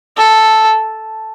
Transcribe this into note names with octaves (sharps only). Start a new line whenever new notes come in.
A4